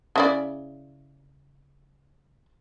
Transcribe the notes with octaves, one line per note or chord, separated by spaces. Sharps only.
C#3 E4 D5